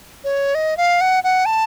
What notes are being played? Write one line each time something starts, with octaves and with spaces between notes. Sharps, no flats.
C#5
D#5
F5
F#5
F#5
A5